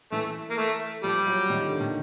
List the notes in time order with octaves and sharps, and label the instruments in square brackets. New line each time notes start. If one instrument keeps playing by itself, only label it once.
[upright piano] E3 [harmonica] A3
[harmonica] A#3
A3
[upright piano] F3 [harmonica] G3
[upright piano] F#3
D#3
D3
D#3